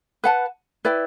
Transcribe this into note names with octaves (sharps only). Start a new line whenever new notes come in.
B4 F#5 A5
E4 B4 D5 G5